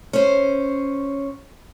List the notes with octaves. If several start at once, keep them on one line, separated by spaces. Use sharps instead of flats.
C#4 C5